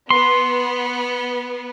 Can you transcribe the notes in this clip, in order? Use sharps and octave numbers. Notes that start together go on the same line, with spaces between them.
B3 C6